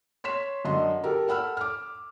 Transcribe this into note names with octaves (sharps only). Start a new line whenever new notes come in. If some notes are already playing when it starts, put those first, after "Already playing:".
C#5 C6 B6 E7
F#2 D3 D#5 C6
G4 A4 A#4
A4 F#5 B5 E6 F6
D6 F6